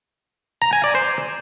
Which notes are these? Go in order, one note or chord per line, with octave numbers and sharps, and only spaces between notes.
A#5
G#5
D5
C5